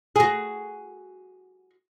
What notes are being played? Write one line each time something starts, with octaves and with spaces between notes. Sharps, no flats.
F#4 G#4